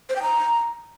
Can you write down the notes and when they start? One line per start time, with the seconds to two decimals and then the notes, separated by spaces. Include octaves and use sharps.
0.09 C5
0.16 G5
0.22 A#5